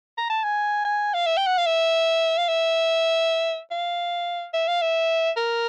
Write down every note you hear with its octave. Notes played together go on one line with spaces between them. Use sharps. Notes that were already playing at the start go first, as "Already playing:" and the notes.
A#5
A5
G#5
G#5
F5
E5
G5
F#5
F5
E5
F5
E5
F5
E5
F5
E5
A#4